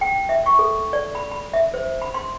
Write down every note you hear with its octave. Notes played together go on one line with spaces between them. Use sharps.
G5
E5
C#6
A4
D5
B5
B5
E5
C5
B5
C6